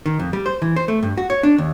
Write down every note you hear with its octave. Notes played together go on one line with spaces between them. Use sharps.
D#3
F2
G3
C5
E3
C5
A3
G2
F#4
C#5
D4
D#2